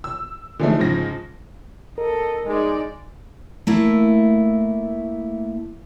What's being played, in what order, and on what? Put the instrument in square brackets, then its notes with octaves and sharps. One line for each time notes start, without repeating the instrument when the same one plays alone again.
[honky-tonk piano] E6
D3 E3 F3 G#3 A3 D#4
G#2 C#3 F3 A#6
[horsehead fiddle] A4 D#5 [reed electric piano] A#4
[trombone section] G#3 [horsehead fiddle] D#4 D5
[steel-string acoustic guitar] A3 A#3 E4